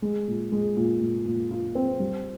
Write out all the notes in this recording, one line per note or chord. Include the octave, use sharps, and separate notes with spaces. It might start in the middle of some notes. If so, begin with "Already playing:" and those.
G#3
A#2
G#3
A#2
A#2
A#2
F4
C4
G3